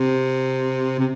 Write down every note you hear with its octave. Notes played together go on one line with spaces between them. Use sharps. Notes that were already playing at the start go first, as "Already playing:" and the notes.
Already playing: C3
C3